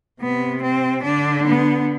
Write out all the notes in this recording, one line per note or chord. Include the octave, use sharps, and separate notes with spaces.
C3 B3
C4
D3 D4
B3